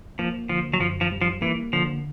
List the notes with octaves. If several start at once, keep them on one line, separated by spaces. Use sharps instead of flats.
F3 A#3
D3 F3
F#3
F#2 F3
F3
G3
F3
E3 A#3
D3 F3